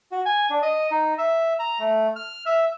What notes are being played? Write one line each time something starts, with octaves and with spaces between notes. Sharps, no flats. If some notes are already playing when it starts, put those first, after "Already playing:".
F#4
G#5
D4
D#5
D#4
E5
A#5
A3
F6
E5